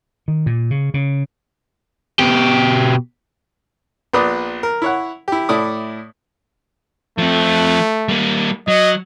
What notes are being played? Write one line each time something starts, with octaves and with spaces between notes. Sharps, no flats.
D#3
A#2
C#3
C#3
B2 G4
A#1 B3 F4 B4 D5 D#6
A#4
E4 C#5 F#5
E4 G4
A2 E4 A4 D5 D6 D#6
F3 A3 C4
G3 A#3
F#3 D#5